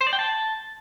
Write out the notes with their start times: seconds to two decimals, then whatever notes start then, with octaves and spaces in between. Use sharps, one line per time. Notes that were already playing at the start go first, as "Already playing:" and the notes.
0.01 C5
0.07 D5
0.13 G5
0.19 A5